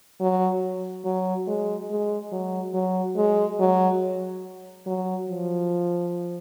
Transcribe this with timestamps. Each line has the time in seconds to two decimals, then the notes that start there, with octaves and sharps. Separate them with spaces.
0.21 F#3
1.05 F#3
1.47 G#3
1.90 G#3
2.32 F#3
2.74 F#3
3.16 G#3
3.59 F#3
4.86 F#3
5.29 F3